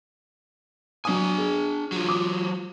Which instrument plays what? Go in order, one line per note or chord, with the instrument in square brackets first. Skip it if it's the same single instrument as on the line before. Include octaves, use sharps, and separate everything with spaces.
[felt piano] F#3 D#6 [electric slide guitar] D4 G#5
[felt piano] G#4
[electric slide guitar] F#3 F4
[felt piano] D6 D#6